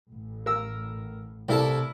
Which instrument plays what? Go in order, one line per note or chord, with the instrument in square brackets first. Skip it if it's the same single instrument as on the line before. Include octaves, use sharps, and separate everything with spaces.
[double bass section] A1 A2
[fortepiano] A#4 E6
[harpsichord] C2 A4 A5 [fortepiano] E4 A#4 D5